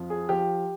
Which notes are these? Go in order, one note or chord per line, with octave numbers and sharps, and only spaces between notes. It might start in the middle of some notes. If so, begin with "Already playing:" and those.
Already playing: F2 F3
G#4
F3 G4